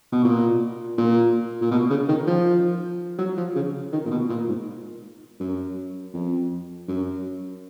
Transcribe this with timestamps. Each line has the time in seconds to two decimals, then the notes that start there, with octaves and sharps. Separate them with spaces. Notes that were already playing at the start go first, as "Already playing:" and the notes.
0.12 B2
0.24 A#2
0.98 A#2
1.61 A#2
1.71 B2
1.90 C#3
2.08 D#3
2.27 F3
3.19 F#3
3.37 F3
3.55 C#3
3.92 D#3
4.05 A#2
4.11 B2
4.29 A#2
4.48 G#2
5.40 F#2
6.13 F2
6.88 F#2